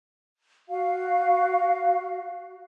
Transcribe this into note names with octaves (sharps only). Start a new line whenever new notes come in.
F#4 F5